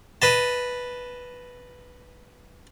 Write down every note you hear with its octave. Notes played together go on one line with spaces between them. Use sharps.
B4 D#5 A5